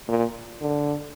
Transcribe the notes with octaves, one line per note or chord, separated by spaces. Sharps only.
A#2
D3